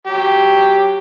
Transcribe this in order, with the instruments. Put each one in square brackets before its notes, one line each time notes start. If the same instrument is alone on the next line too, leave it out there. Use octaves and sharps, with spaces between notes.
[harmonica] F#3 G4